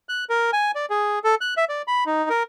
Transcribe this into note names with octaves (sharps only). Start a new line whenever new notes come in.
F#6
A#4
G#5
D5
G#4
A4
F#6
E5
D5
B5
D#4
A#4